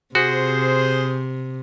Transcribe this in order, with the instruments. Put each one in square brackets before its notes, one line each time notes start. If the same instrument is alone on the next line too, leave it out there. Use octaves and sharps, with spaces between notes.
[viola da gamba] C3 [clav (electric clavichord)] F#4 [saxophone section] G#4 C5